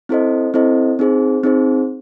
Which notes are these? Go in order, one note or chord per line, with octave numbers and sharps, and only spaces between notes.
C4 E4 A4 C5 D#5
C4 E4 A4 C5 D#5
C4 D#4 G#4 C5
C4 D#4 G#4 C5